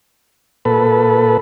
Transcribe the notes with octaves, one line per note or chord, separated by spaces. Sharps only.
A#2 A4 B4